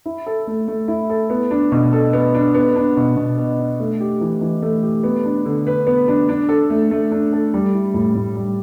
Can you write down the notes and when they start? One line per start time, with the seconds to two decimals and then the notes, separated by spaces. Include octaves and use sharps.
0.06 E4
0.26 A4
0.47 A3
0.68 A3
0.88 E4
1.10 A4
1.30 B3
1.51 D4
1.72 B2
1.93 A4
2.13 B3
2.34 D4
2.55 B3
2.76 D4
2.97 B2
3.17 B2
3.38 B3
3.59 D4
3.80 A3
4.00 G4
4.21 E3
4.41 E3
4.62 A3
4.83 G4
5.04 B3
5.24 D4
5.45 D3
5.67 B4
5.87 B3
6.08 D4
6.29 D4
6.49 A4
6.70 A3
6.91 A3
7.11 D4
7.33 A4
7.54 G3
7.74 E4
7.94 A2
8.15 A2
8.36 G3